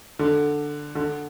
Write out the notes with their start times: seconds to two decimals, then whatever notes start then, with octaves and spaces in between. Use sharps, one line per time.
0.19 D3
0.95 D3